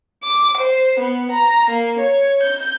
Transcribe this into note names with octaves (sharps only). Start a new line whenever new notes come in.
D6
C5
B3
A#5
A#3
C#5
G6